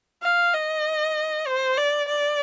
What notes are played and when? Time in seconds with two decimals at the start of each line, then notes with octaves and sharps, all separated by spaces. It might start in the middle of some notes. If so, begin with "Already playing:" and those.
0.23 F5
0.54 D#5
1.47 C5
1.77 D5
2.08 D5